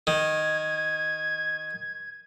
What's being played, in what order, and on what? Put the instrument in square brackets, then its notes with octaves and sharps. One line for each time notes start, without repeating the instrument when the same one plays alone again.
[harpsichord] D#3 [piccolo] G#6